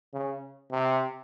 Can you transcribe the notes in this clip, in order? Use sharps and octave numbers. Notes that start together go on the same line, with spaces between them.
C#3
C3